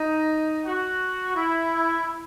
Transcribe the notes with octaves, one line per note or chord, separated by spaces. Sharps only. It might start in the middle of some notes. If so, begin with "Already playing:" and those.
Already playing: D#4
F#4
E4